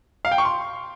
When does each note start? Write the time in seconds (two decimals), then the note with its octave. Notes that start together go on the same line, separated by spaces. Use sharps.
0.25 F5
0.31 G5
0.38 C#6
0.45 C6